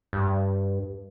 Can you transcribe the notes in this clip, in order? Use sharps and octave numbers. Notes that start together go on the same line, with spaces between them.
G2